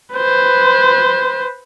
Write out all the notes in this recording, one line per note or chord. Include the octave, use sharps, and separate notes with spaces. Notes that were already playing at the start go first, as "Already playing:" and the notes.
B4 C5